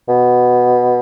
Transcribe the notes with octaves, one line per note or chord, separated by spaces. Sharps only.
B2